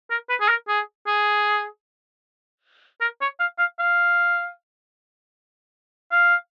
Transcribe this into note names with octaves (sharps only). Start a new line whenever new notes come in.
A#4
B4
G#4
A#4
G#4
G#4
A#4
C#5
F5
F5
F5
F5